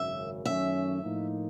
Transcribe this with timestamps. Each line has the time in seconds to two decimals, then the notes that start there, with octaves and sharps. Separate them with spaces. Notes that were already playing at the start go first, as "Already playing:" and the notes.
Already playing: G#1 F#2 C#3 E5
0.45 F#2 D#3 F#3 A3 C#4 E5
1.02 A2 F3 A#3 D#4